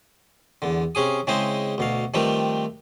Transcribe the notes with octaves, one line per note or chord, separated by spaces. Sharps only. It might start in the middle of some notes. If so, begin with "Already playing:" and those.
E2 D3
C3 C#4 G#4 D#6
C#3 G#3 C4 E4 C5 D#5
D2 B2 F5
D#3 F3 G3 A3 C4 B4